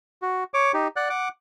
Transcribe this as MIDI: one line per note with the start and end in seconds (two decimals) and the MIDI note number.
0.22 0.44 66
0.54 0.72 73
0.54 0.72 86
0.74 0.88 63
0.74 0.88 67
0.96 1.09 74
0.96 1.09 78
0.96 1.09 90
1.10 1.29 78
1.10 1.29 86